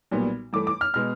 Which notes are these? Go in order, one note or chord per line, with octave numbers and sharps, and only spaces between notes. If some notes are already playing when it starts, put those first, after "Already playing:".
B1 A#2 G3 B3
G2 E3 A3 D6
D6
F6
B2 G#3 B3 F6